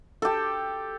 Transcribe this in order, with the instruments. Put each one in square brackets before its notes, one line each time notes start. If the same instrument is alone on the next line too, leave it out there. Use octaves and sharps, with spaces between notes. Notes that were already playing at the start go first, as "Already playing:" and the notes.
[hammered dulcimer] G4 A4